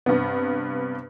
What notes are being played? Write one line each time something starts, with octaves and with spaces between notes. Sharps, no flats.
G2 C3 B3